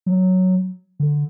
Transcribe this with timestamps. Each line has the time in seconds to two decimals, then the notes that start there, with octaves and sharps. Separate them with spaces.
0.06 F#3
1.00 D3